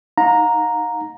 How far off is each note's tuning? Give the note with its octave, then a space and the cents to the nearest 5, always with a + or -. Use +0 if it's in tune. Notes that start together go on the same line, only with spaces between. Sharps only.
D#4 +0 F5 +45 A#5 +0